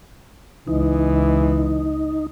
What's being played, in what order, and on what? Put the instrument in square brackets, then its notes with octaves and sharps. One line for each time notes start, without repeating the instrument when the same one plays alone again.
[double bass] C#2 [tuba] E3 [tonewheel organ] D#4